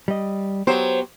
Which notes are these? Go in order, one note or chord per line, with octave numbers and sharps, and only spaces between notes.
G3 D#5
F#3 B3 G4 C5